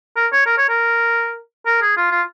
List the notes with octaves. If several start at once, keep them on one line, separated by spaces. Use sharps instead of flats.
A#4
C#5
A#4
C#5
A#4
A#4
G#4
F4
F4